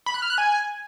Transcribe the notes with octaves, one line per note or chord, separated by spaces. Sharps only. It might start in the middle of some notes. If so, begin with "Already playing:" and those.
B5
F#6
F6
F#6
G#5